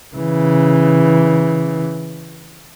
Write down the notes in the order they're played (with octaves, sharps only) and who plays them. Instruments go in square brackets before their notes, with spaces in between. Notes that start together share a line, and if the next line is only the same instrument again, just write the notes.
[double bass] C#3 E3